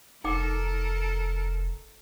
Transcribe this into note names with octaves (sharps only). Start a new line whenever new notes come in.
F1 D#4 A4 A#4 G5 D6